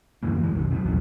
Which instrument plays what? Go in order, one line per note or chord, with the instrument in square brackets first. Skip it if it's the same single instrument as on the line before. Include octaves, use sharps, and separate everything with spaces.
[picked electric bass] F#2 D3 E3 A#3
E3 G#3
F1 B1 A#2 D#3
C3 F#3
A#1 E2 B2 F#3